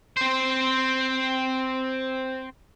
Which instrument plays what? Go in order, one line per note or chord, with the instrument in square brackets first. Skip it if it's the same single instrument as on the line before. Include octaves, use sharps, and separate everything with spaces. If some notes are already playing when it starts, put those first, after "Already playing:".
[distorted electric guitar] C4 C5